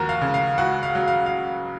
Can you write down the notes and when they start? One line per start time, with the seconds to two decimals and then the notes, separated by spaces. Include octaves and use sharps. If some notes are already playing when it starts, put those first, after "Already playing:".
Already playing: D#2 F3 F#4 A#4 A#5
0.09 F5
0.22 C#3
0.34 F5
0.58 C#2 F#4 F#5
0.83 F5
0.95 F#3
1.08 F5
1.26 F5